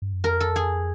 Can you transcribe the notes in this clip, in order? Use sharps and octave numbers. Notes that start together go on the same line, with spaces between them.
G2
F#2
F2 A#4
A4
G#4